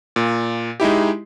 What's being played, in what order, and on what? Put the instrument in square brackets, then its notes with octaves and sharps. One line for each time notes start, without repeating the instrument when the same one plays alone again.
[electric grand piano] A#2
G#3 D#4 E4 G4